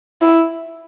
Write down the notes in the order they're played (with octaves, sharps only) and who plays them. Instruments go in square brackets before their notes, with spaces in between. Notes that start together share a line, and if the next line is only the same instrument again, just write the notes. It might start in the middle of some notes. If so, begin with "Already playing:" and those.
[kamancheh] E4